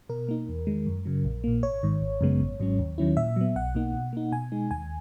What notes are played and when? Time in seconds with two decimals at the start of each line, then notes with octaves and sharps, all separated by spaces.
0.09 B2 A#4
0.29 A#3 D#4
0.49 E2
0.67 D#3 G#3
0.87 F#2
1.05 C#3 F#3
1.25 A#1
1.44 A#2 A#3
1.63 G#1 C#5
1.83 G#2 D#3
2.01 G#1
2.21 F#2 C#3 G#3 B3
2.40 G#1
2.60 G#2 F#3 C#4
2.79 D#2
2.98 D#3 F#3 C#4 E4
3.17 A#2 E5
3.36 F#3 B3
3.56 B1 F#5
3.75 B2 A#3 D#4
3.94 B2
4.13 A#3 D#4
4.32 B2 G#5
4.52 G#3 D#4
4.71 D#2 G#5